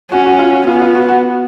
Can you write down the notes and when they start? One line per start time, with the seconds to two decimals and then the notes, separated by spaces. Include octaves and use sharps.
0.11 C#4 F#4
0.26 F#4
0.39 F4
0.54 F#4
0.67 B3 F4
0.82 F4
0.95 F#4
1.09 F#4